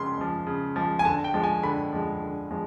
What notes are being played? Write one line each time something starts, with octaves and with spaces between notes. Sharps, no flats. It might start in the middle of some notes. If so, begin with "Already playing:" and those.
Already playing: C#3 F3 G#3 C6
F3 G#3
C#3
F3 G#3
G#5
D3 A5
G5
F3 G#3
G#5
D3 B5
F3 G#3
D3
F3 G#3